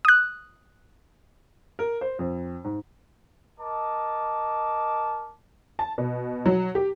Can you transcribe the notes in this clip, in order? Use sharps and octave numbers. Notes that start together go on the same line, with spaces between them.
D#6 F#6
A#4
C5
F2
G#2
A#4 D#5 A5 D6
A5
B2
F#3
G4